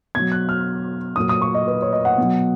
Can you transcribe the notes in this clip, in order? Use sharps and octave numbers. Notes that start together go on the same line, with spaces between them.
B2 F#3 G#6
F#6
F6
A#2 F#3 D#6
D#6
C#6
D#5
B4
C#5
D#5
F#5
B2 F#3